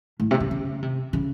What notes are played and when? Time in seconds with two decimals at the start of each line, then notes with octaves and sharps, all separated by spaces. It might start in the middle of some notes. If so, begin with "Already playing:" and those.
0.20 A2
0.31 C3
0.40 C#3
0.51 C#3
0.82 C3
1.13 C#3